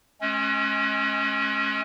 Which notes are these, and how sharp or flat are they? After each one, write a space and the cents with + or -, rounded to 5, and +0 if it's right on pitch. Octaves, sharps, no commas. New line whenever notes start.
G#3 +35 C#4 -20